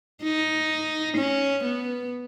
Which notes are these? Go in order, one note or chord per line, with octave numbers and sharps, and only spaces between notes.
D#4
C#4
B3